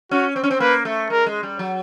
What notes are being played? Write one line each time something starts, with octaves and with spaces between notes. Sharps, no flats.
C#4 F#4
C4
C#4
C4
A#3 B4
A3
G#3 A#4
G#3
G3
F#3